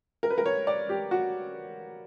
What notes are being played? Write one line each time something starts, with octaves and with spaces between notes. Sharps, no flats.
A#4
B4
A#4
C#5
D5
G4
F#4